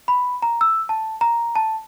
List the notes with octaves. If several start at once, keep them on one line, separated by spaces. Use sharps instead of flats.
B5
A#5
E6
A5
A#5
A5